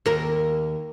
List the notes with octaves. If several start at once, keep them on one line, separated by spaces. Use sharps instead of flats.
D#2 A#4